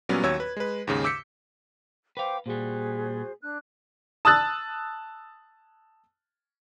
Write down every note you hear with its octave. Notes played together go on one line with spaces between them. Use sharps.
A#2 F#3 G3 B3 C#4
D#2 F#3 C#5 C#6 E6 G#6
B4
G#3 B4
D#2 G#2 C#3
D6 E6 G6 B6 C#7
B4 C5 F5 G5 D6
A#2 G3 F#4 G#4 C5
D4 F#6
A5 D#6 E6 F#6 A6